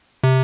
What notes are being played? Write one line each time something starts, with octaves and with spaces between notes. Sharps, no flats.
C3